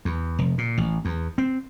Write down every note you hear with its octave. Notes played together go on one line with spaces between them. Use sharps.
E2
F1
A#2
A1
E2
C4